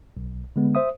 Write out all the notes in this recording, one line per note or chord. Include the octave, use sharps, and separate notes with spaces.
B1
D3 G#3 B3
C5 E5 D#6